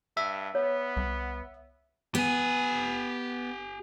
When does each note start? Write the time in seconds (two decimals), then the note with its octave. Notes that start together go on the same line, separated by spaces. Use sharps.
0.17 G2 E5
0.55 B3 C#5
0.97 C2
2.15 B3 G4 G#5